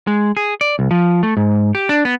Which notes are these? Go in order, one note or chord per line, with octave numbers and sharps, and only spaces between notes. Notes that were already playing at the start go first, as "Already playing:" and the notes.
G#3
G#4
D5
C2
F3
A3
G#2
G4
D4
B3